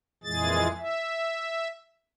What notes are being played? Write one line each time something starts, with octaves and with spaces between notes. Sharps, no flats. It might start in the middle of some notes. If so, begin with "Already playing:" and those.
F2 A#2 E3 G#3 G#4 A6
E5